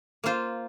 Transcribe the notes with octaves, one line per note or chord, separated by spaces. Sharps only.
A#3 F4 C5